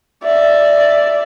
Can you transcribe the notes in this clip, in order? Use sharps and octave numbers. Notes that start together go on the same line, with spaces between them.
D5 E5